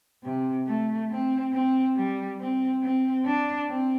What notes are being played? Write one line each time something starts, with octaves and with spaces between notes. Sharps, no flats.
C3
A3
C4
C4
G3
C4
C4
D4
C4